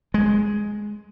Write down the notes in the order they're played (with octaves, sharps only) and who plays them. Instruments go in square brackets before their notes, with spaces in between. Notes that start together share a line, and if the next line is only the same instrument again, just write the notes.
[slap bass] G#3